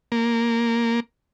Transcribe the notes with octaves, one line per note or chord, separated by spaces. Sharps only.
A#3